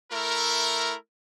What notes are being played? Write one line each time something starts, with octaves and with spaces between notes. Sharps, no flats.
A3 E4 A#4